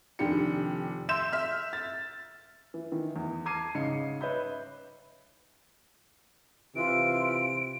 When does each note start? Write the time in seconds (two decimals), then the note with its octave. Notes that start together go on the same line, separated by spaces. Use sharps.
0.19 F1 D#3 D4 G4 C#7
1.09 E5 C6 E6 G6 E7
1.32 E5 F6
1.73 A6
2.74 E3
2.92 D#3 E3
3.16 E2
3.45 A5 A#5 D6 G#6 C7 D#7
3.75 G#2 C#3 D#5 C7 C#7
4.21 B4 C#5 D#5 E5 B5 G6
6.76 C3 E3 F4 D7